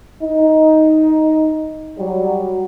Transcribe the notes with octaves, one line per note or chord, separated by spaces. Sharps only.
D#4
F#3 G3